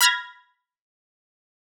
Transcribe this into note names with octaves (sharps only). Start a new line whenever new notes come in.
B5 F6 G#6 A#6